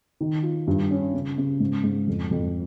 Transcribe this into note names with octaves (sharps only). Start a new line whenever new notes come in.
D#3
F4
G2
C#4
C#3
C#3
G#2
G#2
F2
F2